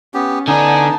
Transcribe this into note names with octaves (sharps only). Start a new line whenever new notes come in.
B3 C#4 G4
D3 B3 D4 D#4 G#5 A5